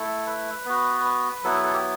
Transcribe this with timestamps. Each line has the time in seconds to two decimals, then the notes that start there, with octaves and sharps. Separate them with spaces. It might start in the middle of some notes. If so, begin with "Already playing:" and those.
Already playing: A3 E4 A4
0.27 B4
0.66 B3 F#4
1.05 B4
1.44 F#3 B3 E4 A4
1.54 B4
1.63 A4
1.73 G4